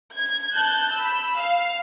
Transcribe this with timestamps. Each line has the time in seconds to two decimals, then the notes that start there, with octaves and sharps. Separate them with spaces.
0.12 G#6
0.54 A5 F#6 G6
0.95 B5 E6
1.39 F5